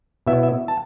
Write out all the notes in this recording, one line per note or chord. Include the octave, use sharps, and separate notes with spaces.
B2 B3 E4 E5
E5
A5